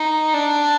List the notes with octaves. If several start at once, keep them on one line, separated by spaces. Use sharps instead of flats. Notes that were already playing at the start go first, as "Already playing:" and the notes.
Already playing: D#4
D4